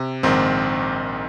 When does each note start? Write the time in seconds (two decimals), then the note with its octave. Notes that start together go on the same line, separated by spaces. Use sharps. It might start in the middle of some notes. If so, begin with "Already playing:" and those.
Already playing: C3
0.23 A#1 G#2 D#3 C4